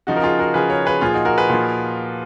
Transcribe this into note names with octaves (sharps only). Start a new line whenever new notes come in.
C#3 F3 D#4 F#4
A#4
F4 G#4
F#4 A#4
C#3 F3 G#4 B4
A#4 C#5
G#4 B4
A#2 F3 F4 G#4
D#4 F#4
F#4 A#4
G#4 B4
A#2 F3